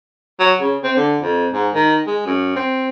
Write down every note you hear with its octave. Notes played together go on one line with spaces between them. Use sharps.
F#3
C#3
C4
D3
F2
G#2
D#3
G#3
F#2
C4